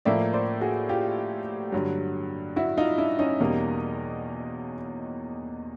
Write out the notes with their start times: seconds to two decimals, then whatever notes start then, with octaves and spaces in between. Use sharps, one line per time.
0.05 A2 F3 A#3 D5 E5
0.33 C5 D5
0.61 F#4 G#4
0.89 F4 G4
1.72 G2 D3 F#3
2.56 E4 F#4
2.77 D#4 F4
2.98 D4 E4
3.19 C#4 D#4
3.40 E2 B2 G3 A#3